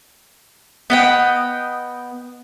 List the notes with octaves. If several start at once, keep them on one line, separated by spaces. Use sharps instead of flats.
B3 D#5 G5